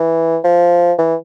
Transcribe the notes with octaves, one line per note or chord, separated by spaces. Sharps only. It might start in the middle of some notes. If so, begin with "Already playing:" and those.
Already playing: E3
F3
E3